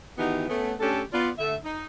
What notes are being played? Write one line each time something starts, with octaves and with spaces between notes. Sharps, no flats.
D#3 E3 B3 D#4 F#4 G4
A3 B3 C#4
A3 C#4 D4 G4 A4
B3 F4 D5
D3 A3 E5
D#4